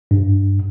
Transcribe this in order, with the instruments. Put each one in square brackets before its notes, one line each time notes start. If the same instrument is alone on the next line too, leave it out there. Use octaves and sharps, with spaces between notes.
[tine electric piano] G2